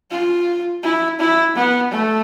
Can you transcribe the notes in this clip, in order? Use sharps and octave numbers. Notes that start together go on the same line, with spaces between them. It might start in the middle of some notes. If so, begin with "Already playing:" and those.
F4
E4
E4
B3
A3